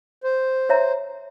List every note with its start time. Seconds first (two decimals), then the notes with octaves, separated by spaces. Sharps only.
0.24 C5
0.69 C#5 E5 A#5